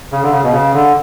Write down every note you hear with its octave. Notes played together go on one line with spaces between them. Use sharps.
C#3
D3
C#3
B2
C#3
D3